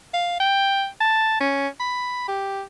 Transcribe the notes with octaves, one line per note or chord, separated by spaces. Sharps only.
F5
G5
A5
C#4
B5
G4